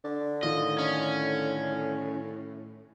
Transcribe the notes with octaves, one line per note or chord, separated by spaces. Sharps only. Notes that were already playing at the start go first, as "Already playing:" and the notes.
D3 D4
A2 D#3 F4 D#5
C#4